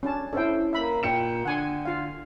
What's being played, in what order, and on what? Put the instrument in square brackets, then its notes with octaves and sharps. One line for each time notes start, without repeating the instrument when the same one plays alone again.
[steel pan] C#4 D4 A5
[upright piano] C#4 E4 [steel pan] A4 C5 G5
[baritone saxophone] A#3 [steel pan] E5 B5
[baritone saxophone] A#2 [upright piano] G5 C#7 E7
[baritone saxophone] D3 [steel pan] F#5 G#5 C6
[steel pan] F4 F5